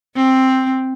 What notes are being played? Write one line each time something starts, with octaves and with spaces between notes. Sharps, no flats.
C4